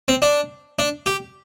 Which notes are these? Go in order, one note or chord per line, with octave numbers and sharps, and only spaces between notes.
C4
D4
D4
G4